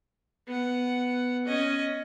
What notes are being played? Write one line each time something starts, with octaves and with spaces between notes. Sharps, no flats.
B3 F#5
C#4 D#5